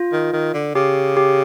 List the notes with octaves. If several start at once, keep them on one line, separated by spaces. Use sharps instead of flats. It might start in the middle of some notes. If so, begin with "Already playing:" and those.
Already playing: F4
D#3
D#3
D3
C#3 G4
G4